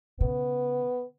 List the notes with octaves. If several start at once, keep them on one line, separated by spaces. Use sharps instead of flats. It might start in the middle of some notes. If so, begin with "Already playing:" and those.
C#3 B3